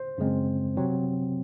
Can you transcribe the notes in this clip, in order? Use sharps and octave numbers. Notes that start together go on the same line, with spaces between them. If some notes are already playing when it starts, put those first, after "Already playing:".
Already playing: C5
F#2 C#3 G#3 C4
C3 F#3 C4